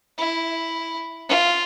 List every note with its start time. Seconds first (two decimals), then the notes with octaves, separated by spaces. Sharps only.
0.18 E4
1.29 F4